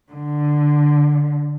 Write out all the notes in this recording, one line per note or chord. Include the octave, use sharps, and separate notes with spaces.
D3